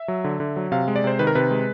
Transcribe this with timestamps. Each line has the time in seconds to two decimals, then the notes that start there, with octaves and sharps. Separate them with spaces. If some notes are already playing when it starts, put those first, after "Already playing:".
Already playing: E5
0.08 F#3
0.24 D3
0.40 D3
0.56 F#3
0.72 C3 F5
0.88 G#3
0.96 D5
1.04 C3 C5
1.19 D#3 B4
1.27 A#4
1.35 C3 B4
1.51 G#3